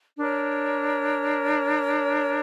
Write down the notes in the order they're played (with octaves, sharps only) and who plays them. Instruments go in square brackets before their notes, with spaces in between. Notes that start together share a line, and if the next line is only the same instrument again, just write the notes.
[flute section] D4 A#4 C#5